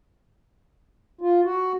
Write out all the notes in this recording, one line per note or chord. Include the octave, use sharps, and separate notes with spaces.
F4
F#4